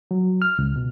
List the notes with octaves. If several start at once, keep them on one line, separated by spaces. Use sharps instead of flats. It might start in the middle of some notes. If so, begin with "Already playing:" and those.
F#3
F6
C#2
B2